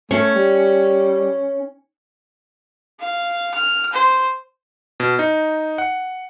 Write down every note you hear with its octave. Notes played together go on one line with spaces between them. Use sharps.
A3 C#4
G3
F5
F6
C5
B2
D#4
F#5